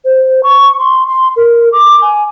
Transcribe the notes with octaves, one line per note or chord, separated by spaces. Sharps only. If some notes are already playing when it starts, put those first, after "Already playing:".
C5
C#6
C6
C6
A#4
D6
G#5